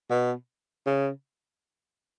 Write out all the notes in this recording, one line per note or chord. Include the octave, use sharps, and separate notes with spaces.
B2
C#3